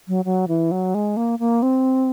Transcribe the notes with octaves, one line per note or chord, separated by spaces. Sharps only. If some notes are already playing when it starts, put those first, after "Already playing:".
F#3
F#3
E3
F#3
G#3
A#3
A#3
C4